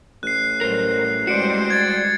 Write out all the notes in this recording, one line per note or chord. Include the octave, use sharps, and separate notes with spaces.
A1 F#6 C7
A2 F#3 G3 A#4 C5
G3 G#3 F#4 C5 D5 C#7 D7
G#6 A6